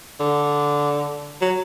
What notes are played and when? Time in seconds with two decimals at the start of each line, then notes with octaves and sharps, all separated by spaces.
0.20 D3
1.41 F#3